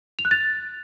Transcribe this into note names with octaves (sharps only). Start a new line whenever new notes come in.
F7
F#6
A6